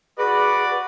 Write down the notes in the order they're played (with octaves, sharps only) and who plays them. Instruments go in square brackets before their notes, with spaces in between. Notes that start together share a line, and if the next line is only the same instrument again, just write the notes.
[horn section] F#4 D5 [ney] G#4 [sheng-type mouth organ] B4